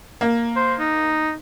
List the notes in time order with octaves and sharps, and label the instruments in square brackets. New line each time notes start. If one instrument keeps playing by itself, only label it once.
[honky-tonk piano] A#3
[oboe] C5
D#4